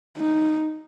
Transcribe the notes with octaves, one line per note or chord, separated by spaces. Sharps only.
D#4